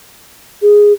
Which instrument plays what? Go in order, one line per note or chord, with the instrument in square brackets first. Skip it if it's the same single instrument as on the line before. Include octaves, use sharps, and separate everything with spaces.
[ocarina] G#4